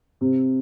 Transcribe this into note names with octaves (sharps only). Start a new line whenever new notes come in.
C3